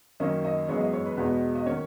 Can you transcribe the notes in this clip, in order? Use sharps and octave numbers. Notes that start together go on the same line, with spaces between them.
F#2 D#3 A#3 C#4 D#5
D#5
F#2 E3 G#3 B3 D#4 C#5
D#5
C#5
B4
E2 B2 G#3 B3 D#4 B4
D#5
D#3 A#3 C#4 C#5